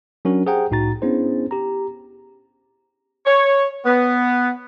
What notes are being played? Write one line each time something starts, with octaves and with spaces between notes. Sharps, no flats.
F#3 C#4 D4 F#4 A#4
G4 G#4 C5 F#5 G5 A#5
C2 A2 D#4 F#4 A#5 A6
B3 C#4 D4 E4 G#4 C5
G4 A#5
C#5
B3